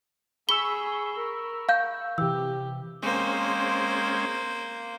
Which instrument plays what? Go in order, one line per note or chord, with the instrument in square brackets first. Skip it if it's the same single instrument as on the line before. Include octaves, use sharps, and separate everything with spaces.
[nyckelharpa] G#4 [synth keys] B5 C#6 E6 [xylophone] G7
[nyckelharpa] A#4
[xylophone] F5 G6
[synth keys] C3 E3 [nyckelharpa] G4 [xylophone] E6
[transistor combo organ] G#3 C4 C#4 [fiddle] A#3 C5